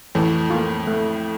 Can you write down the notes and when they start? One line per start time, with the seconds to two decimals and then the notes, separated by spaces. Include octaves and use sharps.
0.15 F2 A2 E3
0.50 A#3 F4
0.87 A3